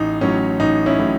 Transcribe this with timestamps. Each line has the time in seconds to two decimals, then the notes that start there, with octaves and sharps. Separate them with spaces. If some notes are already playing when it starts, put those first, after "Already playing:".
Already playing: A1 D#4
0.21 A2 F#3 C#4
0.60 A1 D#4
0.86 C#4 E4
0.98 A2 F#3